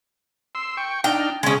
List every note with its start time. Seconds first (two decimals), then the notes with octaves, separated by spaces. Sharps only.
0.55 C6 E6
0.77 G5 C#6
1.04 D4 D#4 G5 F6
1.43 C#3 G#3 C#4